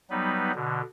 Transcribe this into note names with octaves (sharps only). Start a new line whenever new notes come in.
F#3 G3 B3 D#4 B4
B2 D3